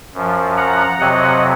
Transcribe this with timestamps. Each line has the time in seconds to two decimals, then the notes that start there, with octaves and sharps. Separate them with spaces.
0.15 F#2 F3
0.57 F#5 A#5
0.99 F2 C3 F#3 D#5 F#5